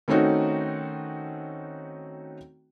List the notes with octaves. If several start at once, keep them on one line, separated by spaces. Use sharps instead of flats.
D#3 A3 C4 C#4 D#4 F#4